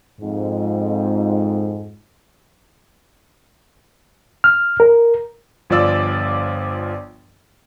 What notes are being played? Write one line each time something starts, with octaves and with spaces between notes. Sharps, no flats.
F2 G#2
F6
A#4
G1 F3 F4 D5 E6